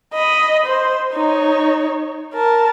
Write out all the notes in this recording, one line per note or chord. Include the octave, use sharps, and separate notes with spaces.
D#5 B5
C5
D#4 C#5
A#4 A5